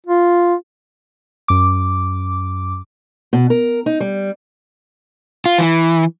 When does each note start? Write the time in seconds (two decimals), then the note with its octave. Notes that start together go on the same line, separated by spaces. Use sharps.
0.06 F4
1.48 F#2 D6
3.33 B2
3.50 A#4
3.86 D#4
4.00 G3
5.46 F4
5.58 E3